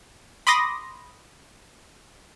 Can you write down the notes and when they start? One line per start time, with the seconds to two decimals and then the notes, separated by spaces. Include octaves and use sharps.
0.47 B5 C6 D6 D#6 A#6